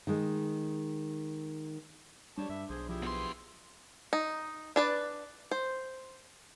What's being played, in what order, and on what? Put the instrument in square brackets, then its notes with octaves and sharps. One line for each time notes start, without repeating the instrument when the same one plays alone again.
[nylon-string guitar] D#3 G#3
[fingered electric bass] G3 [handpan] D4 [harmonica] G4 C#5 A5
[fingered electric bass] G2 [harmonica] E5
[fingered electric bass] B1 [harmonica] G#4 C5
[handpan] F3 [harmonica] E4 G4 G#4
[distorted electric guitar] F#2 C6 [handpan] B3
[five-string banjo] D#4
D4 B4 D5
C5